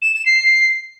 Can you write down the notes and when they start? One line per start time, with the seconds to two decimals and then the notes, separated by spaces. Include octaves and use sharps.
0.02 E7
0.14 E7
0.26 C7